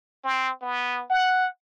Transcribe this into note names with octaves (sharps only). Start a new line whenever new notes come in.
C4
B3
F#5